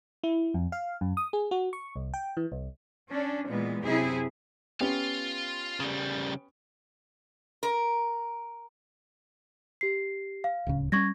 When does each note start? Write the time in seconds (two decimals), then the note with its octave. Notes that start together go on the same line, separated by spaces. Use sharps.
0.23 E4
0.54 F2
0.72 F5
1.01 F#2
1.17 D#6
1.33 G#4
1.51 F#4
1.73 C#6
1.96 C2
2.14 G5
2.37 E3
2.52 C2
3.11 C#4 D4
3.48 A#2 E3 G#3 B3
3.83 F#2 C3 E4 G#4
4.80 B3 C#4 F4 G4 F5
5.80 C#3 G3
7.63 A#4
9.81 G4 C7
10.44 F5
10.67 D1 C#2 C#3
10.92 G3 A#3 C#4 C#6 G#6 A#6